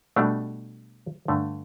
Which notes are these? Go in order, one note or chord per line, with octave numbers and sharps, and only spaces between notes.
B2 G3 A3 D4
G2 D3 A3